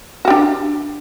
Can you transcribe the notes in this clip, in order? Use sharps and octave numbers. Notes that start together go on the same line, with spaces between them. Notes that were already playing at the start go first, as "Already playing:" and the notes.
D4 F#4 G4